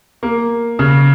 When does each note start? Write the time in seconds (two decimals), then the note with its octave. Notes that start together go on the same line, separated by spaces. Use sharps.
0.23 A#3
0.79 C#3